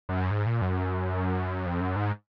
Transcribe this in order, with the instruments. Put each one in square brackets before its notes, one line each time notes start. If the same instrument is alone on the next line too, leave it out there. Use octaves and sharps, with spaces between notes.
[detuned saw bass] F#2
G#2
A#2
F#2
F2
F#2
G#2